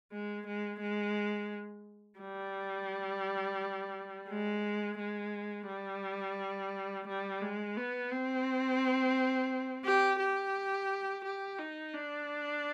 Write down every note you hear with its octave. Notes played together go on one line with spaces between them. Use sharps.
G#3
G#3
G#3
G3
G#3
G#3
G3
G3
G#3
B3
C4
G4
G4
G4
D#4
D4